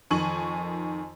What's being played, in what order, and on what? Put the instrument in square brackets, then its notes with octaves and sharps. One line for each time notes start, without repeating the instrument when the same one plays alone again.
[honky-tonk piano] F2 D#3 G#5 C#6 F#7